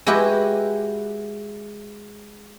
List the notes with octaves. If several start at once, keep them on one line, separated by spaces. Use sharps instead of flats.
G#3 E4 F#4 G4 B4 D#5